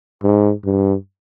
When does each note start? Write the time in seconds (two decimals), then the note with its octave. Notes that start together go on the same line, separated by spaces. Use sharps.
0.23 G#2
0.65 G2